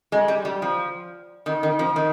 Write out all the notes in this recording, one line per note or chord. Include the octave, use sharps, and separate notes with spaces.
G#3
G3
G3
F3
D#3
D#3
F3
D#3